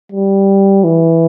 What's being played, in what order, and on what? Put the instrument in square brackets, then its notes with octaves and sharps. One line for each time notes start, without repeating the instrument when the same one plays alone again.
[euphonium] G3
E3